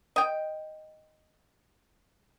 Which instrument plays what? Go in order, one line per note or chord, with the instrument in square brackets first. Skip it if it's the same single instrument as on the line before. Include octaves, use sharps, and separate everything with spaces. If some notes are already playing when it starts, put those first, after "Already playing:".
[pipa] D#5 G5